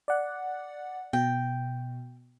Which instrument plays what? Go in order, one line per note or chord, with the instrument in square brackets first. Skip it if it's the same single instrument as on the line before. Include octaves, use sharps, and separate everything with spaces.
[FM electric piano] D5 F#5
[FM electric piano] B2 [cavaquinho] G5